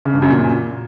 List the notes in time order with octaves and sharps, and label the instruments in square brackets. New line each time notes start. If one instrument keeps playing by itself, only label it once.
[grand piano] C#3
G2
F#2
A#2